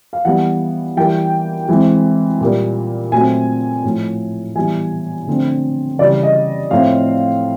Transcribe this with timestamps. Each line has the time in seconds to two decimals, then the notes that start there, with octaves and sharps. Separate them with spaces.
0.13 F5
0.25 E3 G3 B3 F#5
0.97 E3 G3 A#3 G5
1.69 E3 G#3 C4
2.41 A#2 G3 A#3
3.12 A#2 F#3 A3 C4 G#5
3.84 A2 F3 A3
4.55 E3 G3 B3 G#5
5.27 D3 F3 A3 C4
5.99 C#3 E3 G3 D5
6.23 D#5
6.71 A2 F3 A3 C4 F5